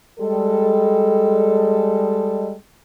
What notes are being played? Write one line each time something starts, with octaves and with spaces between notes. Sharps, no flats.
G3 G#3 A4